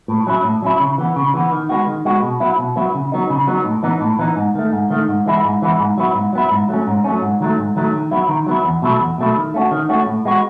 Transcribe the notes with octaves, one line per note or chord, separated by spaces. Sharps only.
A2
F#3 C#4 E4
A2
F#3 C#4 E4
C#3
E3 B3
C#3
E3 B3
D#3
G#3 B3 F#4
D#3
G#3 B3 F#4
B2
F#3 B3 E4
B2
F#3 B3 E4
C#3
F#3 B3 D#4
C#3
F#3 B3 D#4
A2
E3 B3 D#4
A2
E3 B3 D#4
G#2
D#3 A3
G#2
D#3 A3
G#2
E3 G#3 B3 E4
G#2
E3 G#3 B3 E4
G#2
F#3 B3 E4
G#2
F#3 B3 E4
G#2
F#3 A3 C#4
G#2
F#3 A3 C#4
G#2
D#3 F#3 A3
G#2
D#3 F#3 A3
D#3
F#3 B3 E4
D#3
F#3 B3 E4
E2
B2 F#3 A3 E4
E2
B2 F#3 A3 E4
D#3
A3 C#4 F#4
D#3
A3 C#4 F#4
A2
G#3 B3 F#4